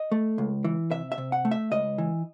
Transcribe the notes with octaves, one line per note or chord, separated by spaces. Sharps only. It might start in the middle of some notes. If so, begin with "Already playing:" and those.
Already playing: D#5
A3
C#2
E3
C3 E5
E5
C3
F#5
A3
E5
C#2 D#5
E3